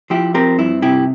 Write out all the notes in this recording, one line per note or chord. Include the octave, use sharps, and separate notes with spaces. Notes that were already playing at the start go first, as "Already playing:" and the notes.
F3 E4 G4
C4 G4 A#4
G2 E4
C3 E4 G4